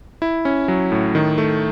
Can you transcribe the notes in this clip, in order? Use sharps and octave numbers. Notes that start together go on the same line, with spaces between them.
E4
C#4
F#3
A2
D#3
A3